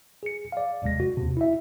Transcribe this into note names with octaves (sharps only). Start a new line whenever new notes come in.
G#4 C#7
D5 F5
G1 D#2 C3 G#3 A#6
F#4
D#2 C3
E4 E5